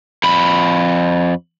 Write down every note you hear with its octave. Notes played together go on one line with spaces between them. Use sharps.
F2 B5